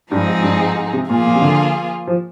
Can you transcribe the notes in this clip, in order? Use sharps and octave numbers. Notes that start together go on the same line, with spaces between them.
G2 F3 G#3 C4 D#4 G#4
G#2
G2
G#2
G#2
C3
A#2 F3 A#3 F4 G#4
A#2
C3
D3
F3